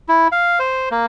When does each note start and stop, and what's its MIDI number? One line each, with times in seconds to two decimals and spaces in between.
0.09 0.28 64
0.32 0.59 77
0.59 0.89 72
0.91 1.06 58